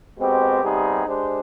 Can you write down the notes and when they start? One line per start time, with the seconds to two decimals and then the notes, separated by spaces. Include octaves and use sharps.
0.17 B2 G#3 C4 G4
0.62 C3 G3 B3 D#4 G#4
1.06 G#3 D4 G4 C5